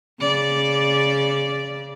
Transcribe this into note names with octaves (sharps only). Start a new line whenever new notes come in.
C#3 D5